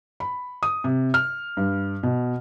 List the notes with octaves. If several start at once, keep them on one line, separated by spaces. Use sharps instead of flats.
B5
D#6
C3
F6
G2
B2